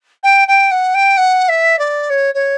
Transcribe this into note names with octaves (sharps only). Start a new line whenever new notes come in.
G5
G5
F#5
G5
F#5
E5
D5
C#5
C#5